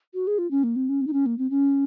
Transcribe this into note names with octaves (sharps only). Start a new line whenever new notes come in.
F#4
G#4
F4
C#4
A#3
C4
C#4
C4
D#4
C#4
A#3
C4
C#4